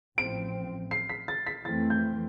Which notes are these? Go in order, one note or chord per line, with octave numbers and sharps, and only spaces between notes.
A1 A2 F3 C4 D7
C7
B6
A6
B6
F2 E3 A3 C4 A6
G6